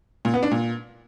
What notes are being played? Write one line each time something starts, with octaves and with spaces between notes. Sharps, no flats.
A#2
B3
D4
A#2